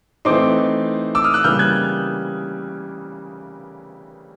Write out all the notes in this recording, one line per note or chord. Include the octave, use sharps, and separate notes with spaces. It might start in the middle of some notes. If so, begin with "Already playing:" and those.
E3 A3 C4 D#4 C6 D6
D6 E6
D#6 F6
E6 F#6
C#3 E3 G3 A#3 F6 G6
F#6 G#6